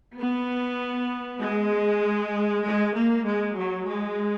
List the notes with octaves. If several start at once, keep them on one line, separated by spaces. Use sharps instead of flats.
B3
G#3
G#3
A#3
G#3
F#3
G#3